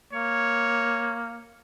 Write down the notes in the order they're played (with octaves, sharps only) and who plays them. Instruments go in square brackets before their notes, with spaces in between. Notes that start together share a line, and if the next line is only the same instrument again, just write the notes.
[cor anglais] A#3 [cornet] C#5